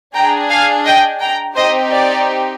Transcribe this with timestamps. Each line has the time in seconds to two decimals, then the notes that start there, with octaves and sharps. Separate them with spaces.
0.14 D4 G#4 G5 A#5
0.50 F5 G#5
0.85 D#5 G5
1.20 G5 A#5
1.56 C4 D#4 G4 C5 D#5
1.91 D5